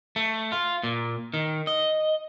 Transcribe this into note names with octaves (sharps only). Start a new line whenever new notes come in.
A3
F4
A#2
D#3
D#5